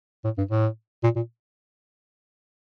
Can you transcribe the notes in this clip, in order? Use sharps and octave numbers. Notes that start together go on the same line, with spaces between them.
A2
G2
A2
A#2
A#2